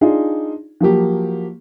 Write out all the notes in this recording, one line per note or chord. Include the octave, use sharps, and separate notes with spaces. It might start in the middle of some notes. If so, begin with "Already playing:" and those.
D4 D#4 F4 G#4
F3 F#3 A#3 G4